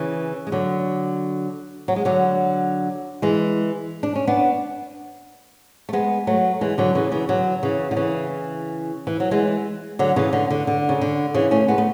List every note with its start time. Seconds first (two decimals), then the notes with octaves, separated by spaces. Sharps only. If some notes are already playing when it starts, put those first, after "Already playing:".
Already playing: C#3 E3
0.47 G#3
0.52 D3 F#3
1.88 F#3
1.96 G#3
2.05 D3 F#3
3.22 E3 G#3
4.03 D4
4.15 C#4
4.27 B3 D4
5.89 A3
5.93 G#3 B3
6.27 F#3 A3
6.61 E3 G#3
6.78 D3 F#3
6.95 C#3 E3
7.12 C#3 E3
7.29 D3 F#3
7.63 C#3 E3
7.91 D3
7.96 C#3 E3
9.07 E3
9.20 F#3
9.31 E3 G#3
9.99 D3 F#3
10.16 C#3 E3
10.33 D3
10.50 D3
10.67 D3
10.89 C#3
11.01 D3
11.34 C#3 E3
11.51 A3 C#4
11.68 G#3 B3
11.78 A3